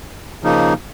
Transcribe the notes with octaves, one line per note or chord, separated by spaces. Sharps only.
C#3 F3 A#3 D#4